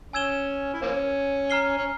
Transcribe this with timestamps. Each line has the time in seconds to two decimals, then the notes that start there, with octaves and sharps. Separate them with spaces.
0.13 C#4 G#5 E6 G#6 E7 G7
0.73 E4
0.82 F3 A#3 C#4
1.50 A#5 F6 C7 G7
1.78 C#4